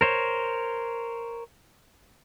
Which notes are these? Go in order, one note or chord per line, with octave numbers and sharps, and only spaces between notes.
A#4 C5 C#5